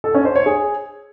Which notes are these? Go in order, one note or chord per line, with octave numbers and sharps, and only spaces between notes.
A4
C#4
C5
C#5
G#4